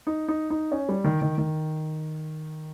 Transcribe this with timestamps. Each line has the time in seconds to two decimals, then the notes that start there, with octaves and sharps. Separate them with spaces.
0.07 D#4
0.28 D#4
0.50 D#4
0.72 C#4
0.89 G3
1.04 D#3
1.22 D#3
1.38 D#3